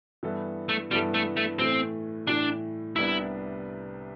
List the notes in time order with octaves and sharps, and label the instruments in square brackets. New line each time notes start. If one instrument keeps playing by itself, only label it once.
[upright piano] G2 E3 B3 E4 A4
[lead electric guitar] A3
[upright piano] G2 E3 B3 E4 A4 [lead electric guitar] G3
[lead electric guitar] A3
A3
[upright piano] A2 E3 A3 [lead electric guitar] C4
[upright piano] A2 E3 A3 [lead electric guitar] D4
[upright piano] C2 C3 G3 B3 D4 [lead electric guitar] E4